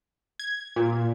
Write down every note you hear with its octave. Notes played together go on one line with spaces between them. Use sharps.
G#6
A#2